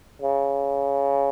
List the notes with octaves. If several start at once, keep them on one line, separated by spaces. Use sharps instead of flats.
C#3